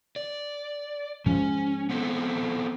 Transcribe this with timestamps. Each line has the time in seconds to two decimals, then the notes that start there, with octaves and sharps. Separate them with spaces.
0.16 D5
1.26 G#2 F3 C#4
1.89 B3 C4 A4